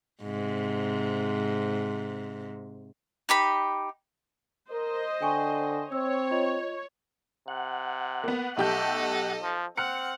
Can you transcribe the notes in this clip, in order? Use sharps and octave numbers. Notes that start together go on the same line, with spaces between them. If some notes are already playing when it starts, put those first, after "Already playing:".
G#2 C3
D#4 G4 B5
A#4 C5 D#5
D3 G5 G#5 C#6
C4 C#5 E6
F4 D#5 F7
C3 F#5
A#3 B3
B1 A3 G4 A4 D#5 G6
F3
C4 F#5 F6 F#6 C#7